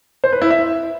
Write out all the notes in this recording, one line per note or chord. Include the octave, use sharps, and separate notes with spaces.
C5
B4
E4
E5